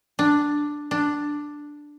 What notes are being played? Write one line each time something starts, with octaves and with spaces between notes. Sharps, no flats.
D4
D4